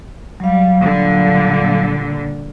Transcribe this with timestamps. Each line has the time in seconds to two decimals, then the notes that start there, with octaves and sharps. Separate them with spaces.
0.40 F#3 G3 F5
0.82 A#2 D3 G3